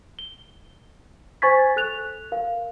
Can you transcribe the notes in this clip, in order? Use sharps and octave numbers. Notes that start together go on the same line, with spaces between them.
G7
C5 G#5 C#6 G#6 A6 B6
A4 F#6 F7
A#4 F5